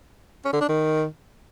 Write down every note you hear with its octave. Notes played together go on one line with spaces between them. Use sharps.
C#4
D3
D4
D#3